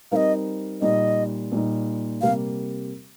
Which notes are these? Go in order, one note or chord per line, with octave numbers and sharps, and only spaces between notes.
G3 C4 D#4 A#4 D#5 F5
A#2 G3 D#4 D#5
A#2 G3 D#4
C3 G3 A#3 G4 A#4 F5